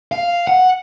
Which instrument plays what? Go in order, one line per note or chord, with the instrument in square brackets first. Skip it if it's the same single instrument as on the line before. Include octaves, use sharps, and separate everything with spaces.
[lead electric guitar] F5
F#5